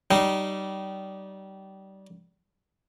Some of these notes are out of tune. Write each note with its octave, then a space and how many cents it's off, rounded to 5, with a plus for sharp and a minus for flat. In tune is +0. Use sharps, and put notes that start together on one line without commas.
G3 -25 D#4 -20